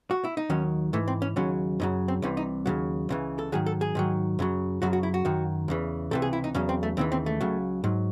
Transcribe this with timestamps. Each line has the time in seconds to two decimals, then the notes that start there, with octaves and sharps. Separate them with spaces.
0.11 F#4
0.24 E4
0.37 D#4
0.50 D#2 D#3 F#3 C#4
0.93 G#2 E3 A3
1.08 C4
1.22 C#4
1.36 D#2 C#3 F#3 C#4
1.80 F#2 C#3 F#3 D#4
2.08 C4
2.22 C2 C3 E3 C#4
2.37 D#4
2.66 D#2 C#3 F#3
3.09 C#2 C#3 E3
3.39 A4
3.52 G#2 D#3 F#3 G#4
3.66 A4
3.81 G#4
3.95 G#2 D#3 F#3
4.39 F#2 C#3 F#3
4.82 F#2 C#3 F#3 F#4
4.93 F#4
5.03 E4
5.14 F#4
5.25 F#2 D#3 F#3
5.68 E2 C#3 E3
6.11 C#2 C3 E3 A4
6.22 G#4
6.33 E4
6.44 D#4
6.54 E2 C#3 F#3 C#4
6.69 C4
6.83 A3
6.97 D#2 C#3 E3 C4
7.12 C4
7.26 A3
7.41 C#2 C#3 F#3
7.84 G#2 F#3